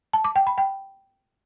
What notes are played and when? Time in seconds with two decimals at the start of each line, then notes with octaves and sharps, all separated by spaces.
0.13 A5
0.25 D6
0.36 G5
0.47 B5
0.58 G5